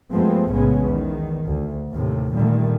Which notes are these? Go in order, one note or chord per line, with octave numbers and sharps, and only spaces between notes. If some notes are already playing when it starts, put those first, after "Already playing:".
G2 F3 G#3 A3 B3 C4
B1 A2 C#3 G#3 B3 C#4
E2 D#3
D2
D#2 A2 C3
A#2 D3 D#3 G3 A3